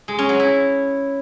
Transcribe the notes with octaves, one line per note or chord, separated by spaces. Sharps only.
G#3
C#4
F#3
E4